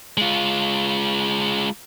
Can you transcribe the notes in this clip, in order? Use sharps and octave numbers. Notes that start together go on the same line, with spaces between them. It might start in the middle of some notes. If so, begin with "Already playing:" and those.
G#3 F4